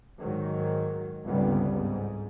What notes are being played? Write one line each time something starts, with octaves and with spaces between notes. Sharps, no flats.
G#2 D#3 F#3
G1 C#2 G2 C3 G3 B3
G#2